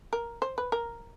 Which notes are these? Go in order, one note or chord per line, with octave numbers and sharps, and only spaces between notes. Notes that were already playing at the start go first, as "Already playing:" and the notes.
A#4
C5
B4
A#4